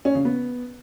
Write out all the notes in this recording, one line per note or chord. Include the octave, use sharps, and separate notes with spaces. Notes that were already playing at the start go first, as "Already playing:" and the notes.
C#4
C#3
B3